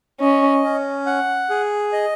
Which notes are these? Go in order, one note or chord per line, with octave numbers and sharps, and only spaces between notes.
C#4 D#5
C#4
F#5
G#4
D#5